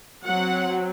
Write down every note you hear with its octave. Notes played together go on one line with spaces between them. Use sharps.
F#3 C4 F#5